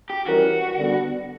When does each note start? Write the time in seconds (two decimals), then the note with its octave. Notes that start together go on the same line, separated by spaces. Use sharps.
0.10 G4
0.26 E3 G3 C#4 E4 F#4 A#4
0.76 D3 G3 B3